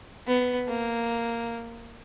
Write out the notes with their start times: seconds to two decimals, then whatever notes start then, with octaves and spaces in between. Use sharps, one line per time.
0.27 B3
0.68 A#3